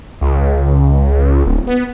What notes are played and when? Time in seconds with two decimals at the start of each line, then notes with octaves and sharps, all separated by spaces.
0.21 C#2
1.46 D1
1.67 B3